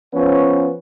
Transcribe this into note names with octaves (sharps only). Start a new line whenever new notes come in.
F3 B3 C#4